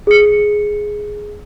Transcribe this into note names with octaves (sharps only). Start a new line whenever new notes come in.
G#4 C#7